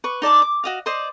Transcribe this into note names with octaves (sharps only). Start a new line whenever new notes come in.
B4 C#6
D#4 D5 A5 D6
D6
F#4 D#5 F5
C5 D5 D#5 C6